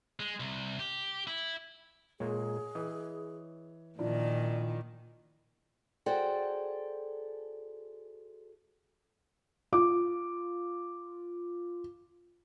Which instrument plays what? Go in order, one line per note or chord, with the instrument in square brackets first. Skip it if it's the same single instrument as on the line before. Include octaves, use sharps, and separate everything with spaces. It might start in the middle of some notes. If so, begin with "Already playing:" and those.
[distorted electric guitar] G#3
C2
G4
E4
[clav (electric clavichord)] A#2 G#3 A#3 [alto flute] G#4 [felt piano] C#5
[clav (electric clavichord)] E3 D#5
[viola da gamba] A#2 D#3 [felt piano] F3 D4 E4 [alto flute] D5
[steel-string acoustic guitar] F#4 G#4 A4 C5 D5 G5
[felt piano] F4 D6